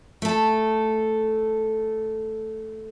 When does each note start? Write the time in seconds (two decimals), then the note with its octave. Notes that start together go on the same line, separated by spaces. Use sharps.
0.22 A3 A4